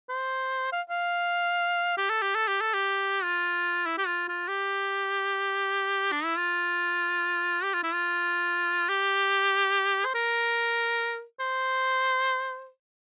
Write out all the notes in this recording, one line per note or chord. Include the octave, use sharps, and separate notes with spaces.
C5
F5
F5
G4
A4
G4
A4
G4
A4
G4
F4
E4
G4
F4
F4
G4
D4
E4
F4
G4
F4
E4
F4
G4
C5
A#4
C5